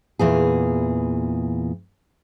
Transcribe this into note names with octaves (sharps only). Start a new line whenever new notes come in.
E2 A#2 E3 G#4